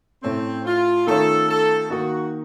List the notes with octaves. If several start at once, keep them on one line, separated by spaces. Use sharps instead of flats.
A2 A3 C4 C#4
F4
D#3 A3 C#4 F4 A4
A4
D#3 A#3 D#4 F#4